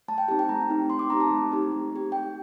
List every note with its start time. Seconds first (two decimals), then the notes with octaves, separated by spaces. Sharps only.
0.08 A3 A5
0.18 G5
0.28 C4 D#4 G4 A5
0.39 G5
0.49 A3 A#5
0.70 C4 D#4 G4
0.90 A3 C6
0.99 D6
1.10 C4 D#4 G4 A#5
1.20 A5
1.30 A3
1.51 C4 D#4 G4
1.72 A3
1.92 C4 G4
2.12 A3 G5